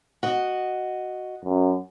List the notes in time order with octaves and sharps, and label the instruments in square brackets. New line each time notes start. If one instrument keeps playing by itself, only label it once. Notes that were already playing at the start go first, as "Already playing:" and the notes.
[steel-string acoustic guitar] F#4 D#5
[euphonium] F#2